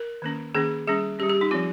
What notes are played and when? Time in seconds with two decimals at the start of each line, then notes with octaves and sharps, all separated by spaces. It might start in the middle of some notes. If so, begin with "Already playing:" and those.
Already playing: A#4
0.22 D#3 A#3 C#4
0.55 D#3 A#3 C#4 G#4
0.87 G3 C#4 G#4
1.19 C#4 G4
1.23 G3
1.29 G4
1.41 D#4
1.51 F3 C4 F4